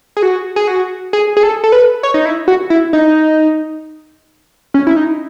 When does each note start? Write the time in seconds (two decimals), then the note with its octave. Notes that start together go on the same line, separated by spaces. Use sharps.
0.17 G#4
0.23 F#4
0.56 G#4
0.68 F#4
1.13 G#4
1.37 G#4
1.43 A4
1.64 A4
1.72 B4
2.03 C#5
2.14 D#4
2.25 E4
2.48 F#4
2.70 E4
2.93 D#4
4.74 C#4
4.87 E4
4.96 D#4